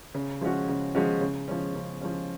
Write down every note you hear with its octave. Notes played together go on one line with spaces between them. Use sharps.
C#3
F3 G#3 C#4 F#4
C#3
F3 G#3 C#4 F#4
C#3
F3 G#3 C#4
C#3
F3 G#3 C#4